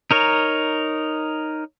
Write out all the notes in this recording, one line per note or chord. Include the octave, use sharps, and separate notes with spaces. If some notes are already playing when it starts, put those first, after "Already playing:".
D#4 A#4 C#5